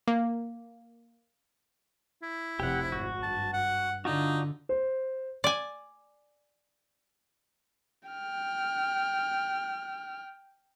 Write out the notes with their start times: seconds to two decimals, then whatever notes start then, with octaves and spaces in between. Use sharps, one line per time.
0.08 A#3
2.22 E4
2.60 F1 C3 G4 F#5
2.92 G#1 F#4
3.23 G2 A5
3.53 F#5
4.05 D3 D4 D#4 F4 F#4
4.69 C5
5.44 D5 G#5
8.09 G5 F6